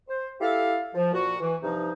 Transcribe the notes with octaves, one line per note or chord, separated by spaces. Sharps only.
C5
E4 G4 A4 F5
F3
A#2 F#4
E3
G2 C3 F3 D#4